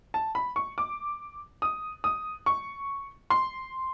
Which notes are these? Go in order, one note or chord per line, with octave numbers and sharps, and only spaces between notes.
A5
B5
C#6
D6
D#6
D#6
C#6
C6